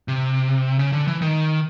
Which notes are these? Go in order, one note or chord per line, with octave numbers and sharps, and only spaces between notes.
C3
C#3
D3
E3
D#3